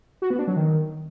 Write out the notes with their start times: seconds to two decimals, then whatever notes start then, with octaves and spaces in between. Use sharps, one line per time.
0.22 F#4
0.30 B3
0.39 D4
0.48 F#3
0.56 D#3